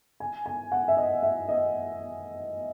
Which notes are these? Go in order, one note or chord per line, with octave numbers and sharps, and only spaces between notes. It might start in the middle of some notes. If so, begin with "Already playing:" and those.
G#5
G#5
F#5
E5
D#5
E5
D#5